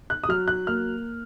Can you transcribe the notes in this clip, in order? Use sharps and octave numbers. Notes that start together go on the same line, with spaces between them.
F#6
D#6
F#3 F6
F#6
A#3 F6